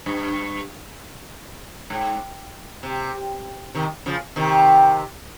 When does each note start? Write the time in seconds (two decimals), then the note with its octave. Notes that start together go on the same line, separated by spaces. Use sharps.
0.06 G2
1.90 G#2
2.83 C3
3.74 C3 D#3
4.06 C#3 F3
4.36 C3 D#3